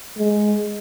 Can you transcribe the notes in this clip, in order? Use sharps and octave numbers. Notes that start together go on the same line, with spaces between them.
G#3